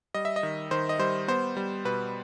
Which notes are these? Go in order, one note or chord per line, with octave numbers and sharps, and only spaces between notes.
G3 D#5
E5
D#5
D#3
D#3 C5
D#5
G3 C5
B3 C5
G3
B2 B4